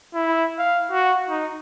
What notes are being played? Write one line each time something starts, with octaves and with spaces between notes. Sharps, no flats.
E4
F5
F#4
D#4